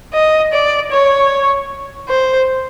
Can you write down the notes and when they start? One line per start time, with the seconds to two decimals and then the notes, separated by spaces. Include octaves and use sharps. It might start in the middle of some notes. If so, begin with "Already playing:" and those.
0.14 D#5
0.52 D5
0.91 C#5
2.09 C5